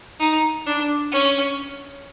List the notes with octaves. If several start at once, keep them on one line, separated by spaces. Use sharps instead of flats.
D#4
D4
C#4